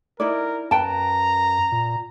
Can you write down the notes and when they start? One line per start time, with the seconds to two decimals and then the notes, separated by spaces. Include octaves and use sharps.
0.20 D#4 E4 A#4 D5
0.71 F#2 B4 G5 A5 A#5
1.72 A#2